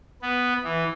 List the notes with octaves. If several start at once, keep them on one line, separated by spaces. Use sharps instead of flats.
B3
E3